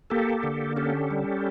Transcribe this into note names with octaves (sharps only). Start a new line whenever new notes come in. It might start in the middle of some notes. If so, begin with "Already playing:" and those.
A#3 G4 A4
D3
C#4 G4 A4
G3